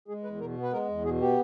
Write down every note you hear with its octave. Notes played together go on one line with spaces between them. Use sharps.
G#3 G#4
E2 B4
B2 A#4
B3
B4
G#3 A#4
E2
B2 G#4
B3 G4